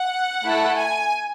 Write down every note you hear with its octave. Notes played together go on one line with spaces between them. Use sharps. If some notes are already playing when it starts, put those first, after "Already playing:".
Already playing: F#5
A3 E4 A4
G#5